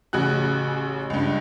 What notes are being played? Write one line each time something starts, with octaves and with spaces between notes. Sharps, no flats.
A1 C#3 F#4 F#6
C#2 G2